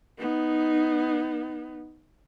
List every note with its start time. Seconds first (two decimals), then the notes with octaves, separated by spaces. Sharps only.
0.19 B3 D#4